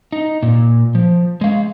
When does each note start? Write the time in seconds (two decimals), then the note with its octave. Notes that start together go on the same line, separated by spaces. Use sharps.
0.12 D#4
0.43 A#2
0.95 F3
1.41 G#3 F5